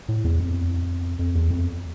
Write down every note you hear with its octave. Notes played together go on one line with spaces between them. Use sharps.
A2
E2
F2
F2
E2
F2